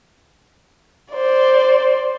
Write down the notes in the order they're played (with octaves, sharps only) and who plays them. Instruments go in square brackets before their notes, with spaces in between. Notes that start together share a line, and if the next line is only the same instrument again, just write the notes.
[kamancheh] C5 D5